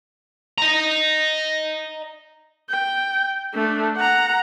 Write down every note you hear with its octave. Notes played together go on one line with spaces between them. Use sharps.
D#5 A#5
G5
A3 D4
F#5 A#5